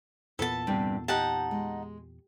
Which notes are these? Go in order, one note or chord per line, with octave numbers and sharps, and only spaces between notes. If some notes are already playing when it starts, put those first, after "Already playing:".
E2 A#2 B3 A4 B4 A5
G2 C3
D#4 G4 F#5 A5
G#3